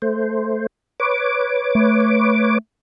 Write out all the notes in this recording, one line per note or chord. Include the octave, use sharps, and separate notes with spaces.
A3 C5
B4 C#5 D6
A3